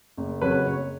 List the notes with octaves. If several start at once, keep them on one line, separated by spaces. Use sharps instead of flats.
F#1
F2 C#3 F#3 C#4 B4
F#1 C#5